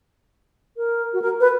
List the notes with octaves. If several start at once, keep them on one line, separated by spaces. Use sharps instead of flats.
A#4
F#4
A#4
B4